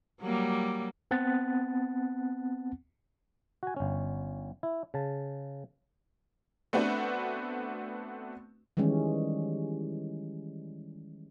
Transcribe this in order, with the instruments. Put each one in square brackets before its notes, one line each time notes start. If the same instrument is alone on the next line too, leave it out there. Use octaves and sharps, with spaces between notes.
[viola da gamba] F#3 G3 A#3
[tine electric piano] B3 C4 F#5 A5 F#6 A6
[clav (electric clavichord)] F#4 G#5
G1 C#4
E4
C#3 A5
[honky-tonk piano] A3 B3 C4 D4 F#4 B4
[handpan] D#3 E3 G3 G#3 C#4